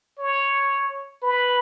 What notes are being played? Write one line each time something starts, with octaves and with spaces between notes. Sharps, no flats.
C#5
B4